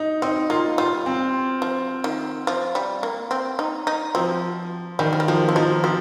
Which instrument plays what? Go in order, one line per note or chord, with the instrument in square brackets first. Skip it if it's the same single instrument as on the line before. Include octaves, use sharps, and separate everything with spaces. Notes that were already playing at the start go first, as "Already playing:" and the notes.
Already playing: [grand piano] D#4
[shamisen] C4 [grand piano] D#4
[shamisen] A#3 [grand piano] F4
[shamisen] G3 [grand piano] F4
[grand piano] C4
[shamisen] F3
D#3
F3
G3
A#3
C4
D#4
D#4
[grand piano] F3 [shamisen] C4
[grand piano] D#3 [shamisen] G3
[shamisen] F3
G3
[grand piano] F3 [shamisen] A#3
[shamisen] C4
[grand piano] F3 [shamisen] D#4
[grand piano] F3 [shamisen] C4